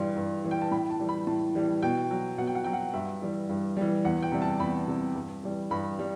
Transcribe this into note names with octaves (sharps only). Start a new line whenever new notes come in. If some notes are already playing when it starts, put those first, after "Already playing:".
Already playing: G2 E3 G3 C6
G2
E3 G3
G5
A5
A2 B5
A5
E3 G3
B5
A2 A5
E3 G3
B2 G5
F#3
B2 F#5
G5
F#5
F#3 G5
F#5
G2 E5
E3 G3
G2
E3 G3
E2 F#5
G5
C3 G3
A5
E2 B5
C3 G3
G2
E3 G3
G2 B5
G3